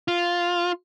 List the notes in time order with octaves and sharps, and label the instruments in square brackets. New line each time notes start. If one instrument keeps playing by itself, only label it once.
[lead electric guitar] F4